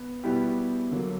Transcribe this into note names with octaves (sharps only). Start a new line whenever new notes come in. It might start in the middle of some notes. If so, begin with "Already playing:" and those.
Already playing: B3
B2 G3 B3 E4 G4
D3 F#3 A#3